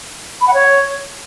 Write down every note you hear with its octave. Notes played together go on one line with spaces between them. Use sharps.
B5
F#5
C#5